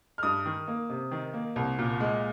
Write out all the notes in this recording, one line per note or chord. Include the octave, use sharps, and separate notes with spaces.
F6
G2 D#6
D#3
A#3
C3
D#3
A#3
C2
A#2
G#3